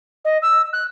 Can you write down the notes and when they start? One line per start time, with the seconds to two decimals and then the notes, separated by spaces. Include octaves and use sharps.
0.24 D#5
0.42 E6
0.72 F#6